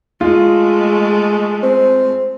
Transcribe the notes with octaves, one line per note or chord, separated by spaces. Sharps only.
G#3 A3 F4
C4